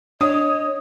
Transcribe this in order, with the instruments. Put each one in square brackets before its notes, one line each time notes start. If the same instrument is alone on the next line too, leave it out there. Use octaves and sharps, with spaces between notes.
[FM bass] D4 [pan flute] C#5 [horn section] D#5 [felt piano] D#6